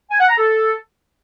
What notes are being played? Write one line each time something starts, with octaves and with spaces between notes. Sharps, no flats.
G#5
F#5
A#5
A4